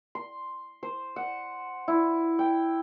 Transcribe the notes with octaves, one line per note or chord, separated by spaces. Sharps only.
C6
C5
F#5
E4
G5